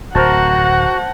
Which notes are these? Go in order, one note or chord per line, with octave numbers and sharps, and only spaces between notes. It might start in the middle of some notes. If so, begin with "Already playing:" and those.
D1 F#4 A#4 C5 F#5 A5